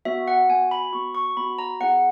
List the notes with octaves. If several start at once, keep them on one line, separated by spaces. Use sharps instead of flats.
B3 F#4 E5
F#5
B3 F#4 G#5
B5
B3 F#4 C#6
C#6
B3 F#4 B5
A#5
B3 E4 G#4 F#5